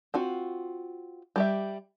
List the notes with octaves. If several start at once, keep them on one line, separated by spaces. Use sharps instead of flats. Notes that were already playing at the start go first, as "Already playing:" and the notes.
C4 F4 F#4
G3 G4 E5